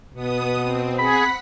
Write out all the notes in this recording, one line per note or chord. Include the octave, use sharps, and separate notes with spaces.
B2 B3 D#6
C4
G#4 F#5 B5 B6